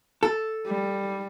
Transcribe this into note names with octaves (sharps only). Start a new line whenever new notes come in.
A4
G3